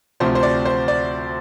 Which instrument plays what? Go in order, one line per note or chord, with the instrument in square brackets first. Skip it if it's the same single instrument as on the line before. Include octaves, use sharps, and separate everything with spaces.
[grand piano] D2 C3 F3 C5
C5
D5
C5
D5